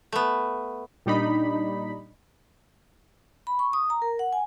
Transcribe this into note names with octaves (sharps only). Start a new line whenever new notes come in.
A3 B3
A#2 G3 D4 D#4 D5 B5
B5
C#6
D#6
A#5
A#4
F#5
G#5